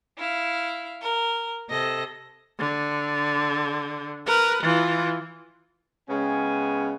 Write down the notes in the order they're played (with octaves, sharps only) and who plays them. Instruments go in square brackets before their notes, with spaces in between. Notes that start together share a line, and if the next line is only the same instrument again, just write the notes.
[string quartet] E4 F5
A#4
C3 A4 D#5 A#6
[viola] D3
A#4 B4
E3 F4
[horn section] C#3 G#3 B3 C#4 G5 G#5